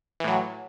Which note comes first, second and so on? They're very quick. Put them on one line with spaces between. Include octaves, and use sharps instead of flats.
E3 A2 F#3